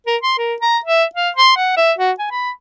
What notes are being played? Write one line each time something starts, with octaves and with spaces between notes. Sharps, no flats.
A#4
C6
A#4
A#5
E5
F5
C6
F#5
E5
F#4
G#5
B5